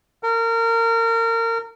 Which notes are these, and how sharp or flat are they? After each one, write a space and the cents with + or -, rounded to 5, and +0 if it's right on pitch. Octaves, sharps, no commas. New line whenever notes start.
A#4 -30